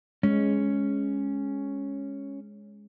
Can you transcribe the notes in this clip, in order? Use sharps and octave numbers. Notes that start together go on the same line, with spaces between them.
G#3 C#4